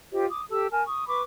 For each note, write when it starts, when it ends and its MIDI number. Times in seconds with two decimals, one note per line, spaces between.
0.12 0.25 65
0.12 0.25 67
0.12 0.25 72
0.12 0.25 75
0.29 0.44 86
0.29 0.44 87
0.50 0.67 67
0.50 0.67 69
0.50 0.67 81
0.50 0.67 88
0.72 0.83 70
0.72 0.83 80
0.72 0.83 81
0.72 0.83 89
0.86 1.07 85
0.86 1.07 87
1.08 1.22 71
1.08 1.22 83
1.08 1.22 85
1.08 1.22 86